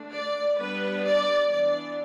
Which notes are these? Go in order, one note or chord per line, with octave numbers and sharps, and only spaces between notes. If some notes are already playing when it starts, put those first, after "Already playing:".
Already playing: D3 A3 D4
D5
G3 B3 D4 B4
D5
E3 B3 D4 D5